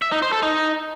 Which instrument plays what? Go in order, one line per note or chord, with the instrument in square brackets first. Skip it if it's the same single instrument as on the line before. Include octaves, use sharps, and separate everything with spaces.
[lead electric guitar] E5
D#4
C5
A4
D#4